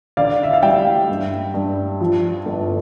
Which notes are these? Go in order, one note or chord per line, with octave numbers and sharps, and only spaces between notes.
D3 D5 F5
E5
F5
G3 E5 G5
G2
G2
F3
G1